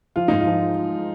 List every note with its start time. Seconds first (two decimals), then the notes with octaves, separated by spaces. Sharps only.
0.16 F3 F4
0.28 G#2 D#4
0.40 F4
0.47 F3